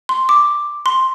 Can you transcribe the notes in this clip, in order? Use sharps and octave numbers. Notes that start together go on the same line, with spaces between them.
C6
D6
C6